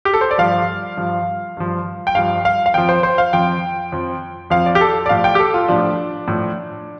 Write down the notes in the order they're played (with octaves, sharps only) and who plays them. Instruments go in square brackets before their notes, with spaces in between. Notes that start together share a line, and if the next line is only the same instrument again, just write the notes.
[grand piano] G4
A4
C5
D5
G2 F3 F5
G2 F3
G2 F3
G5
G2 F3 F5
F5
F5
F2 F3 G5
C5
C5
F5
F2 F3 G5
F2 F3
F2 F3 F5
D5
G4
A4
D5
A2 F3 F5
G5
G4
A4
F4
A2 F3 D4
A2 F3